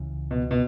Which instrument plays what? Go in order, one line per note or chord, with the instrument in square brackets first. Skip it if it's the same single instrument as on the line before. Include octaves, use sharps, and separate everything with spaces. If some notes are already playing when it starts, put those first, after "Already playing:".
Already playing: [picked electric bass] C#2 C#3 E3
[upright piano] B2
B2